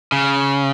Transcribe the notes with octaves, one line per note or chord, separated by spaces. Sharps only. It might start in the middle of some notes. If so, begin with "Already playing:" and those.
C#3